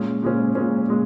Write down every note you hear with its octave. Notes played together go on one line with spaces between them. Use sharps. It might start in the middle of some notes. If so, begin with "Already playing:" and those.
Already playing: A#2 G#3 C#4
A#2 G#3 C#4
A#2 G#3 C#4
A#2 G#3